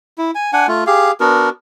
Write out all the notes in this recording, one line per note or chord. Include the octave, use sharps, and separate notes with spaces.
E4
G#5
D4 F#5 G#5
A3 F4
G4 G#4 F5
B3 D4 F#4 A#4